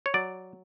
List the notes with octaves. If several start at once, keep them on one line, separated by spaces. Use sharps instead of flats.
C#5
F#3 D5